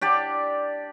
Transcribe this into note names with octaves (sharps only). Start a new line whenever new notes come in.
D4 G4 D5